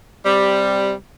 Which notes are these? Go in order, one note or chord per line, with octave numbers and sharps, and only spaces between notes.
C3 G3